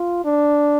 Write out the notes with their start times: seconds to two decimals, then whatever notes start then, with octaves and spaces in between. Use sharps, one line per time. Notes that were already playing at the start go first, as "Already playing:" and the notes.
Already playing: F4
0.25 D4